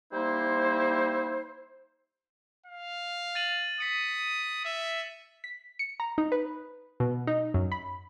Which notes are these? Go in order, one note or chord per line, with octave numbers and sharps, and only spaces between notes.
G3 A#3 D#4 E4 C5
F5
A6 D#7 F#7
D#6 B6 C#7
E5
B6
C#7
A#5
D#4
B4
B2
D#4
F#2
B5